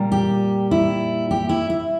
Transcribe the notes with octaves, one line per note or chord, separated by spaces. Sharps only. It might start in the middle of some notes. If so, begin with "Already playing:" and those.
Already playing: A#2 G3 A#3
G4
E4
G4
E4
E4